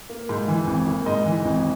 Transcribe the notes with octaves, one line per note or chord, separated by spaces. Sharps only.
A#3
G#2
E3
G#1
A#3
G#2 D#5
E3
G#1